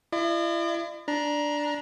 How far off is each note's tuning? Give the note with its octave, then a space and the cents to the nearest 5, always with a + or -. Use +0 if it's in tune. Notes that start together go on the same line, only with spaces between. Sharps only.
E4 +40 D#5 -45
D4 +0 A#5 +20